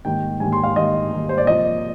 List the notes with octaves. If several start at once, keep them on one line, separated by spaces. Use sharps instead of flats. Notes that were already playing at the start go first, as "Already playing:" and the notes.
G#2 D#3 G3 A#3 G5
G#2 D#3 G3 A#3 G#5
C6
F5
G#2 D#3 G3 A#3 D#5
G#2 D#3 G3 A#3
C5
D5
C3 F3 A#3 D#5